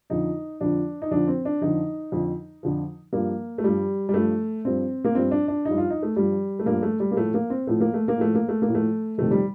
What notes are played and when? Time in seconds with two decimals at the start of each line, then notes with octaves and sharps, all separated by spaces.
0.10 F2 D3 F3 D#4
0.61 F2 D3 F3 D4
1.02 D#4
1.11 F2 D3 F3 D4
1.28 C4
1.45 D4
1.61 F2 D3 F3 D#4
2.12 F2 D3 F3
2.63 F2 D3 F3
3.13 G2 F3 A#3
3.58 A3
3.63 G2 F3 G3
4.09 G3
4.14 G2 F3 A3
4.65 G2 F3 C4
5.05 A#3
5.15 G2 F3 C4
5.31 D4
5.48 D4
5.65 G2 F3 D#4
5.78 F4
5.90 D#4
6.03 A3
6.16 G2 F3 G3
6.59 A3
6.66 G2 F3 A#3
6.83 A3
7.00 G3
7.11 A#3
7.17 A2 F3 A3
7.34 A#3
7.50 C4
7.67 A2 F3 A3
7.81 A#3
7.94 A3
8.08 A#3
8.18 A2 F3 A3
8.35 A#3
8.49 A3
8.62 A#3
8.68 A2 F3
8.75 A3
9.18 F2 C3 D#3 A3
9.31 G3